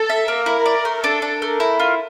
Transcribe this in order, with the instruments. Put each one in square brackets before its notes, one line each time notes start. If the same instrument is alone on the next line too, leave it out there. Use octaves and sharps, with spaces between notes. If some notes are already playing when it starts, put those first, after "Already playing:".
Already playing: [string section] A4
[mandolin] E5
[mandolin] A#3 [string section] A#4
[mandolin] E4
D5
A3
[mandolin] D4 [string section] A4
[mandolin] D4
[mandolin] A3 [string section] A#4
[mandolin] E4
F4